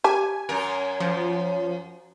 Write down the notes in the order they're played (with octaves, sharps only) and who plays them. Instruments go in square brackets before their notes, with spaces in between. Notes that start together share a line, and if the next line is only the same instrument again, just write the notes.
[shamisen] G4 A5 [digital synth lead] G#5
[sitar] F#2 A#4
[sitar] F#2 [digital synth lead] F3